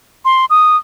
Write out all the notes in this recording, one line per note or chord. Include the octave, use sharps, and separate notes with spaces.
C6
D#6